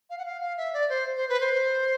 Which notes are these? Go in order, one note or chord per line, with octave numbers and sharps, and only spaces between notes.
F5
F#5
F5
F5
E5
D5
C5
C5
B4
C5